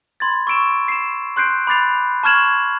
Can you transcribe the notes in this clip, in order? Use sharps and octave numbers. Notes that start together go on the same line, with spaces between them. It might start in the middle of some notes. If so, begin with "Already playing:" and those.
B5 C6 G#6 A6
C#6 E6 D7 E7
C7 E7
C6 F#6 G6 C7 D7
B5 D6 F#6 A6 C7 F7
A5 C#6 F6 G#6 E7 F#7